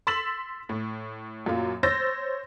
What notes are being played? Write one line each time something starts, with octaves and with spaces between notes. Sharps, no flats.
C6 E6 A6 B6 E7 F#7
A2
F#2 A#2 F#3 F4
C5 C#5 E6 G6 A6 A#6